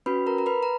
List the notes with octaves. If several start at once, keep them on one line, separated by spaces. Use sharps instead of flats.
C#4 F#4 B4 B5
A#4 A#5
A#5
B4 B5
A#5